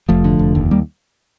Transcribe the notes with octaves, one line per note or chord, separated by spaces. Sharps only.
F1 F3 A3
D3
F1
D#2
G3 A#3